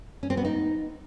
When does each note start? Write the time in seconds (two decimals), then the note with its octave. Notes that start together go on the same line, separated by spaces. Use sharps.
0.23 C#4
0.30 C4
0.37 B3
0.45 D#4